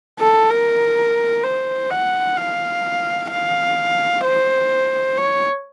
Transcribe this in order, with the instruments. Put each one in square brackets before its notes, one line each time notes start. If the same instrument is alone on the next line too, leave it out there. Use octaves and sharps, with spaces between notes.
[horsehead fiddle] A4
A#4
C5
F#5
F5
F5
C5
C#5